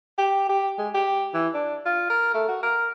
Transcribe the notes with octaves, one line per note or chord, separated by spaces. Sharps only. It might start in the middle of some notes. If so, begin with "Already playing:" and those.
G4
G4
G#3
G4
E3
D4
F4
A#4
A3
F#4
A#4